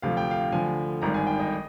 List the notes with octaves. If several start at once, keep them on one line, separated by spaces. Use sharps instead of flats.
D2 C3 F3 F5
G5
F5
D2 D3 F3 G#5
G#1 G2 D#3 A#5
G#5
G5
D#5